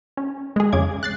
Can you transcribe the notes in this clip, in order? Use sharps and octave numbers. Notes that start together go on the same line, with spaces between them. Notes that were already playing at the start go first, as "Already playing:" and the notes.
C#4
G#3 G#4
F2 C#3 G#4 D6 G#6
F#6 A6 C7